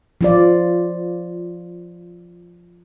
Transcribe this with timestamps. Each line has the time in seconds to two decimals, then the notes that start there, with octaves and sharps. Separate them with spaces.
0.21 F3 F4 D5